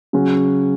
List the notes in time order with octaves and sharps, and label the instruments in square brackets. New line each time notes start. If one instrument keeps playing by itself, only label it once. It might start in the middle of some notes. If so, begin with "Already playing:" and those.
[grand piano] C#3 F#3 C#4 F#4